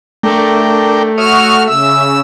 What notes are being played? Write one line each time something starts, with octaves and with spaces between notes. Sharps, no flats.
A3 D4 A#4 G5
F#4 C#5 E5 D#6 F6
C#3 E5 E6